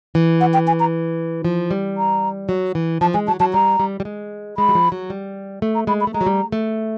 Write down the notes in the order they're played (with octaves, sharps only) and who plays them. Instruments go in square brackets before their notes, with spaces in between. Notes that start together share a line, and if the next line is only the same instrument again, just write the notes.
[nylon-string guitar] E3
[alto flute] F#5
G5
G#5
A#5
[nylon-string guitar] F3
G3
[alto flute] A#5
[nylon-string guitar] F#3
E3
[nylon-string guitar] F3 [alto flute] A5
[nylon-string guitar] G#3 [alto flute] G#5
[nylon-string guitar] F#3 [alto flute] A5
[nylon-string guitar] F#3 [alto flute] A5
[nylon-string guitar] G3 [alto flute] A#5
[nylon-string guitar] G3
G3
G#3
[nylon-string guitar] G#3 [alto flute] B5
[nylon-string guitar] F#3
F3
F#3
G3
A3
[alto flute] A#5
[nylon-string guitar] G#3 [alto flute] B5
[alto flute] B5
[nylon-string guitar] A3
[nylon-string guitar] G#3 [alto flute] A#5
[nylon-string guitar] F#3
G3
A3